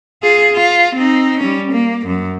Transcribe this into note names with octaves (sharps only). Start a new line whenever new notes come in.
F4 G#4
F4
C4 D#4
G3 C#4
A#3
F#2